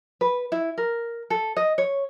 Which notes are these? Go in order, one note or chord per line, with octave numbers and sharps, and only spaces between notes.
B4
E4
A#4
A4
D#5
C#5